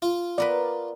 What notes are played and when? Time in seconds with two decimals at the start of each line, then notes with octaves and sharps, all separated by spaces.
0.02 F4
0.38 B3 A#4 B4 D5